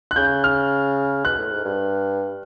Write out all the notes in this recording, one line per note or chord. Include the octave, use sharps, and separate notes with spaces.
F#6
C#3 G6
F6
B2 F#6
A2
G#2
G2